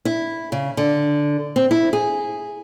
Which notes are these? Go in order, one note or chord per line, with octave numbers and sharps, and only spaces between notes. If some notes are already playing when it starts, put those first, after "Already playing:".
E4
C#3
D3
C4
E4
G#4